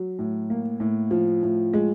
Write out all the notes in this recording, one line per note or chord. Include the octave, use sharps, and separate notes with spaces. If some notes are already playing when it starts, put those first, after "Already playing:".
Already playing: F#3
A2
A#3
A2
F3
A2
G#3